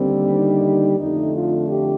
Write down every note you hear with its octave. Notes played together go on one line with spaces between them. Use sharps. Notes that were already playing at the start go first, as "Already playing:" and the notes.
Already playing: D#2 D3 G3 C4
D#4
F2 D3 A3 D#4
F4
G4